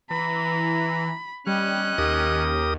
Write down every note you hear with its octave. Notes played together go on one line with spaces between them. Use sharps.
E3 A#5 B5
G3 C#4 D#5 F#6
D#2 G4 A#4 D#6